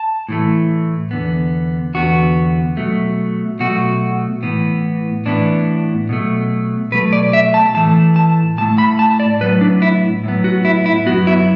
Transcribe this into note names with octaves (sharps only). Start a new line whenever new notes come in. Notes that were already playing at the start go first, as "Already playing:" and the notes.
Already playing: A5
A2 E3 A3
E2 D3 B3
E2 D3 B3 F#4
B2 F#3 A3
B2 F#3 A3 F#4
A2 E3 B3
A2 E3 B3 D4
B2 F#3 A3
B2 F#3 A3 B4
D5
E5
A5
A2 E3 A3 A5
A5
A2 E3 A3 A5
B5
A5
D5
A2 F#3 B3 B4
D4
E4
A2 F#3 B3
F#4
E4
E4
F#2 F#3 B3 F#4
E4